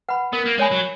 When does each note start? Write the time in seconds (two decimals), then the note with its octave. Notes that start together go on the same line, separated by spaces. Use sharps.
0.09 B4 F#5 B5
0.33 B3 A#4
0.46 A#3
0.58 G#3 C#5 G#5 B5
0.72 F#3